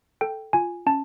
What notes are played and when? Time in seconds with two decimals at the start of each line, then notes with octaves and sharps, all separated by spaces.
0.21 A4 G5
0.53 F4 G#5
0.86 C#4 A5